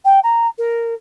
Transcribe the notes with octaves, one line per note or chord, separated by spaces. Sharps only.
G5
A#5
A#4